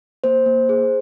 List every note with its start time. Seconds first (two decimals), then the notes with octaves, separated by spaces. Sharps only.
0.24 A#3 C5
0.46 A#3
0.69 G#4